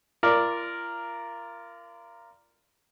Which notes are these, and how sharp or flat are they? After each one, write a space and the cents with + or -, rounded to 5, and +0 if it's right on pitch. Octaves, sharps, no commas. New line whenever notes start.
F4 -35 A#4 +0 D5 +0